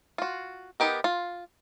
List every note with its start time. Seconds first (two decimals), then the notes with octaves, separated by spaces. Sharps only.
0.18 F4 F#4
0.80 B3 D#4 G4 A#4
1.04 F4